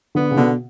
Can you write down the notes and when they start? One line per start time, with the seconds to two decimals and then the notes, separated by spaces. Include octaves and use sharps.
0.15 D3 B3
0.31 C#3
0.36 B2 D3